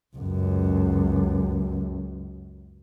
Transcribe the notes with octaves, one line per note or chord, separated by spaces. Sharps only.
C#2 F#2